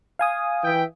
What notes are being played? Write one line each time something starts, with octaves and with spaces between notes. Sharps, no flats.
F5 G#5 D#6
E3 E5 G5